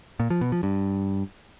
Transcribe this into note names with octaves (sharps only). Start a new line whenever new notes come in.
A#2
F3
B2
F3
G2